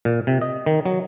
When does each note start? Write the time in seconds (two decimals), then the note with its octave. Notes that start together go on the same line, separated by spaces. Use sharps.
0.05 A#2
0.27 C3
0.42 D#5
0.66 D#3
0.86 F#3